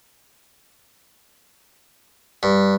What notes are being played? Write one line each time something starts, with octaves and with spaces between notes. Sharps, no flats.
G2